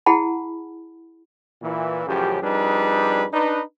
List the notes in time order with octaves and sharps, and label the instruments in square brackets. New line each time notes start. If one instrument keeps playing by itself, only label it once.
[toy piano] E4 G#4 F#5 A5 B5
[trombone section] A#2 E3
A1 F#2 C#3 F3 G4
F2 G3 D4 D#4 G#4 B4
D4 D#4 B4